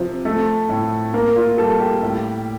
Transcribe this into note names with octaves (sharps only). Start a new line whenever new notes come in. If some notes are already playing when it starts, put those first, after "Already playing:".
Already playing: C3 F3
A3
A2
A#3 A#4
F4
G3 A4
G4
A2